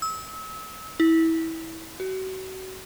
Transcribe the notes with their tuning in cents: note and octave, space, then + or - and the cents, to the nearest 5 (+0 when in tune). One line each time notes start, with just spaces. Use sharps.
E6 -35
E4 -20
F#4 +35